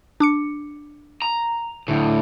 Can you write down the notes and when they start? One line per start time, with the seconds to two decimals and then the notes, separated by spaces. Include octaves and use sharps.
0.20 D4 D6 C#7
1.22 A#5
1.88 D2 A2